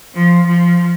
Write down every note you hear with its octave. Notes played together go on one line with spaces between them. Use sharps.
F3
F3